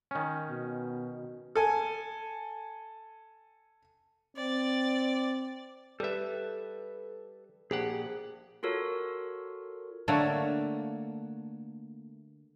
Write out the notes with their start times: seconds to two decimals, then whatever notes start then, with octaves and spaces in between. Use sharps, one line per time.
0.11 D#3 C#4
0.49 B2
1.56 A4 G#5
4.37 C4 D5
6.00 G3 A4 B4 E5
7.71 A#1 G4 G#4 F#5
8.63 F4 F#4 A4 A#4 C#5
10.08 D3 A3 A#3 C#5